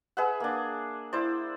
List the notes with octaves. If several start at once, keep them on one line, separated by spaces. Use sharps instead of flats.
G#4 B4 E5 F#5
A#3 D4
E4 C5 D5